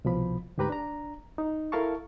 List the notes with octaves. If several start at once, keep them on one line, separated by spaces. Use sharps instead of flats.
C2 B2 F3 B5
D2 G#2 G4 B4 A#5 B5
D4 A#5
D#4
E4 A4 A#4 F5 A5 C#6